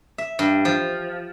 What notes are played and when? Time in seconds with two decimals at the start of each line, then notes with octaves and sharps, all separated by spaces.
0.18 E5
0.39 G2
0.65 F3